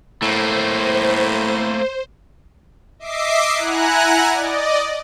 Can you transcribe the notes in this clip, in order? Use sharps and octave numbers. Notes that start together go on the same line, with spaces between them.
A2 A3 A#3 C5
D#5 E5 D6 C7
E4 F#5 G#5 A#5 F#6
D5 D#5